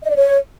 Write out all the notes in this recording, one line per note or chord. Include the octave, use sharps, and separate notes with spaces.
D#5
D5
C#5